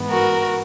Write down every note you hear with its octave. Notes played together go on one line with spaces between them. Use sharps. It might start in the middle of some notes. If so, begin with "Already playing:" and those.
Already playing: G#2 E3 B3
F#4 A#4